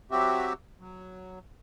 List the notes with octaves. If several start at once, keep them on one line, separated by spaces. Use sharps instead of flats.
F#3 C4 F#4 G4 E5
F#3